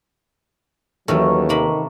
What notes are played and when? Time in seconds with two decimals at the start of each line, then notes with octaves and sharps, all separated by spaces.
1.08 D#2 D#3 E3 F#3 A3 C#4
1.49 C3 D#3 A#3 B5